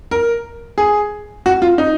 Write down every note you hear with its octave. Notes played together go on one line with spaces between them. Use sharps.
A#4
G#4
F#4
F4
D#4